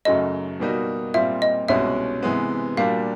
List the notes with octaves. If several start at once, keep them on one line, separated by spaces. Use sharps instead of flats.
F#2 C#3 F#3 A3 D#5
B2 G3 A#3 D#4 F#4
A#2 G3 C4 F4 E5
D#5
C2 B2 G#3 C#4 F#4 E5
C3 E3 G#3 B3
A#2 G3 A#3 D4 F#4 F5